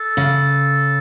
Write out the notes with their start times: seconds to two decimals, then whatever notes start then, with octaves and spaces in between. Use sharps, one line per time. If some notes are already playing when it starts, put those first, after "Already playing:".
Already playing: A4
0.17 C#3